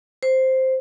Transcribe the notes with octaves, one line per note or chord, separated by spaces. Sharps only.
C5